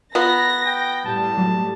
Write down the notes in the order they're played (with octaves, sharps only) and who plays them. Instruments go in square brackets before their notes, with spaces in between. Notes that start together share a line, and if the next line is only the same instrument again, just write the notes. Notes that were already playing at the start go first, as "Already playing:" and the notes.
[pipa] B3 [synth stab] F4 [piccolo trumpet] A#5 [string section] A#6
[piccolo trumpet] G5
[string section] A2 G3 [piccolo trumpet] A5
[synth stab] F#3